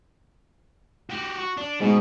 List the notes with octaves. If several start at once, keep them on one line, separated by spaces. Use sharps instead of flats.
F#4 G4
F#4
D4
G#2 B2